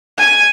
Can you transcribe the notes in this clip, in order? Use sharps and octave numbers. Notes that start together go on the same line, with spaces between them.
G#5